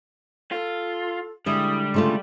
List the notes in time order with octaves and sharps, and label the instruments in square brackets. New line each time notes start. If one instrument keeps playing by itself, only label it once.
[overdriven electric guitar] F4 [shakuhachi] A4
[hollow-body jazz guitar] D3 G#3 E5 [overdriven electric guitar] G3 [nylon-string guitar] E4 [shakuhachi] D#6
[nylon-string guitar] C#3 A3 F4 [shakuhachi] C6